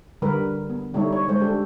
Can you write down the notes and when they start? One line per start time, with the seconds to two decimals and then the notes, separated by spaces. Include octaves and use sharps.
0.22 D3 G3 A#4 B4
0.70 B3
0.93 D3 G3 A3 D#4 E4 C#5
1.13 C#5
1.28 G#3 A3 C5 C#5
1.40 D4 G4 A4